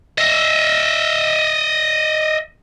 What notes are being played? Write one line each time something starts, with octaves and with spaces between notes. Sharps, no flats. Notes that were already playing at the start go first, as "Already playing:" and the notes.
D#5 E5